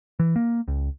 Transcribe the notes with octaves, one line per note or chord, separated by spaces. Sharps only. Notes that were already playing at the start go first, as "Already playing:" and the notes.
E3
A#3
C#2